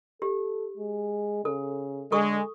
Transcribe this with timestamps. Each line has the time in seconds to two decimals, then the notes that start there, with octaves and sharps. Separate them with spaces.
0.22 G4 A4
0.78 G#3
1.45 C#3 A4
2.12 D3 G#3 A4 C#6 D#6